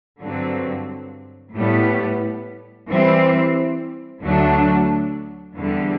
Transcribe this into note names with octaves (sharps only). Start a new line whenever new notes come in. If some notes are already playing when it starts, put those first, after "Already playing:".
G2 D3 F#3 C4
A2 G3 B3
E3 G3 C4
D2 D3 F#3 A3 D4
E2 D3 G3